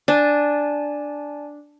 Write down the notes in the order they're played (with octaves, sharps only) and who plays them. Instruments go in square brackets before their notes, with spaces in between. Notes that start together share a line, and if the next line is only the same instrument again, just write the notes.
[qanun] D4 [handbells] D5 G#5 A5